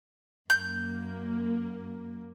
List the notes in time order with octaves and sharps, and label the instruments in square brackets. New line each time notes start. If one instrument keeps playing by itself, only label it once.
[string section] F#2 A#3 [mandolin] G6